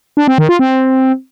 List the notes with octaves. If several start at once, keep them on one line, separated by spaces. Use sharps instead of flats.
D4
C4
D#3
F4
C4